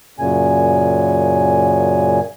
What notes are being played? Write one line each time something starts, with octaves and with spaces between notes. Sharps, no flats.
F#2 A#2 C#3 G#5